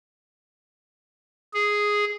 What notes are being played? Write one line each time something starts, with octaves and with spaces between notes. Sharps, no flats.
G#4